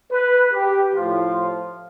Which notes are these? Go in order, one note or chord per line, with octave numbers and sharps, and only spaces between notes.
B4
G4
A2 F3 F4